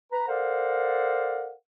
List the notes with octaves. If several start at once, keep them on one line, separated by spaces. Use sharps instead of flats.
B4 A#5
A4 A#4 C5 D5 F5 F#5